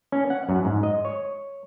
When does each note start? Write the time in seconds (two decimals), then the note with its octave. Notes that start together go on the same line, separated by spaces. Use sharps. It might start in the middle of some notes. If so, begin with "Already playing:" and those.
0.12 C#4
0.30 F#5
0.49 F#2
0.65 G#2
0.83 D#5
1.05 C#5